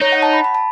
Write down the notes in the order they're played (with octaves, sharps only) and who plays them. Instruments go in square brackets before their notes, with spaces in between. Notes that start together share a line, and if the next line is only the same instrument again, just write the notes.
[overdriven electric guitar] D#4 [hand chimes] C#5
[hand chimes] F#5
A5
B5
B5
A5